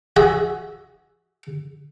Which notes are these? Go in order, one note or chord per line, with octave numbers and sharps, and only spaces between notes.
F#4 G#4 E5